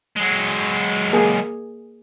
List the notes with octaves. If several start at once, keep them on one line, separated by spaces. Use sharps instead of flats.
F#3 G#3
A#3 G#4